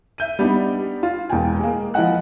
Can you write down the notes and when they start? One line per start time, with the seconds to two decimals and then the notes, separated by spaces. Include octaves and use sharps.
0.18 E5 G6 D#7
0.39 G3 B3 D4 D#4
1.03 F4
1.30 E1 E2 A#3 G5 G#5
1.60 G#3 A#3
1.94 F3 G#3 E4 D#5 F#5 F#6